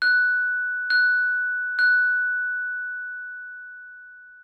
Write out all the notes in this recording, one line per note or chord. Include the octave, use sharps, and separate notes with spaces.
F#6
F#6
F#6